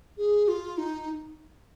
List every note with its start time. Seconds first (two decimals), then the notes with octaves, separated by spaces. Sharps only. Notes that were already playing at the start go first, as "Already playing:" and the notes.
0.18 G#4
0.48 F4
0.78 D#4